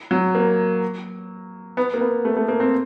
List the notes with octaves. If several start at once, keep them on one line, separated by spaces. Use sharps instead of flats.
F#3
A#3
B3
A#3
B3
A3
A3
A#3
C4